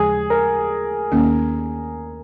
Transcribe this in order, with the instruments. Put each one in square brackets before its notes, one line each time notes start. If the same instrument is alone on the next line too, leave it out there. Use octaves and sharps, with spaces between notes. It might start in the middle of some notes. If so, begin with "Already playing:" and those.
Already playing: [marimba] D#2 C#3 F3 G#3 [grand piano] G#4
[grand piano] A#4
[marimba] D#2 D#3 A#3 C#4